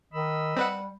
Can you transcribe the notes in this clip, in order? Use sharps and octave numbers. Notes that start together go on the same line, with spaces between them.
D#3 D#5 B5 E6
G3 C4 B4 F#5